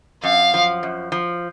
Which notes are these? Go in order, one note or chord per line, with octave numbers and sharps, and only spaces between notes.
F#2 F5
F3
F#2
F3